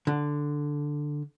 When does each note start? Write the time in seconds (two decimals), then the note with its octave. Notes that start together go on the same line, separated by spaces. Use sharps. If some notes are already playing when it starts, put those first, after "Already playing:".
0.07 D3